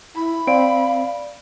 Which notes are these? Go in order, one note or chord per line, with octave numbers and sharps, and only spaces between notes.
E4 B5
C4 D5 F5 D7